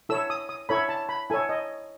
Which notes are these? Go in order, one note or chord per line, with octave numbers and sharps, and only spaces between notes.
E4 A4 C#5 E6
D#6
D#6
E4 A4 C#5 B5
A5
B5
E4 A4 C#5 G#5
D#5